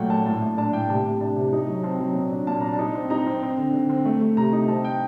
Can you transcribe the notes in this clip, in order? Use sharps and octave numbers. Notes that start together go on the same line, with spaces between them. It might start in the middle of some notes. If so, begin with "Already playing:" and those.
Already playing: A#2 F#3 A3 F#5 G5
A#2 A5
A2 A5
A2
D4 A5
A2 G5
C3 A5
C3
D4 A5
C3
D#4
F#3
C4 A5
F#3
A#2
D4
A#2 A5
D4 A#5
A5
D#4
C4
D#4 A#5
C4
C4
D3
D3
C4
A3
A3
C3 A#5
D#4
C4 A5
C4 G5